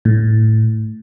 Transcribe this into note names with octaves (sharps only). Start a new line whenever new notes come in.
A2